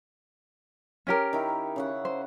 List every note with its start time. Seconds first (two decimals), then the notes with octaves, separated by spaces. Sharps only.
1.07 C#4 G4 A#4
1.33 D#3 E4
1.76 C#3 C#5 F#5
2.05 C5